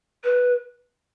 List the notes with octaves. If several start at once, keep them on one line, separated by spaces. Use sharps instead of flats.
B4